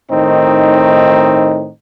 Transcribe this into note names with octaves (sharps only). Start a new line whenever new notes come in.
A2 D#3 C4 D#4